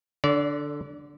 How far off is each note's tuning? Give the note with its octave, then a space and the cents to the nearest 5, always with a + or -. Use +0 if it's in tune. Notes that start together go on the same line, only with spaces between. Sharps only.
D3 +0 D5 -35